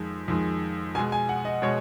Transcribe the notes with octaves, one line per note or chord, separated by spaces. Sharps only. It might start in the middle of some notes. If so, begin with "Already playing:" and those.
Already playing: F2 D#3 G#3
F2 D#3 G#3
B2 G#3 G#5
G#5
F#5
D#5
B2 G#3 C#5